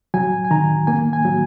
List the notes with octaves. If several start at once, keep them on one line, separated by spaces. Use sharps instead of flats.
F#3 G#5
G#5
D#3 A#5
A#3 G#5
G#5
F#3